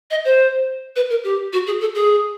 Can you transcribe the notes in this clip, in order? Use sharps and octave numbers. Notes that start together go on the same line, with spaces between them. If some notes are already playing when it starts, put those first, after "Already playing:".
D#5
C5
B4
A#4
G4
F#4
G#4
A4
G#4